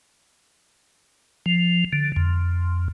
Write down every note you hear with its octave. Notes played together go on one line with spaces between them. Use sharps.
F3
D3
F2